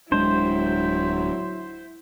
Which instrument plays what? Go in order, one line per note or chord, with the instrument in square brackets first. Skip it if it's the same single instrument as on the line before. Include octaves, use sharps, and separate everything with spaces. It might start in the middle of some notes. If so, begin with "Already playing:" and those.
[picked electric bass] D1 G#3 D4 [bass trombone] F#3 [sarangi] E4 [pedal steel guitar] C5